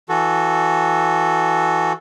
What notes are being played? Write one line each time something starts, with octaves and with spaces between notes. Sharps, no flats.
E3 F#4 A4